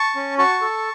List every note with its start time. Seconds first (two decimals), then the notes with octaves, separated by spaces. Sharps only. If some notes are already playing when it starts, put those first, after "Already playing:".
Already playing: A5 C#6
0.15 C#4
0.38 F#4 A5 C#6
0.62 A4